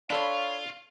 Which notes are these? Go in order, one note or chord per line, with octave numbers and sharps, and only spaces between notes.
D4 F4 A4 C#5 F5 B5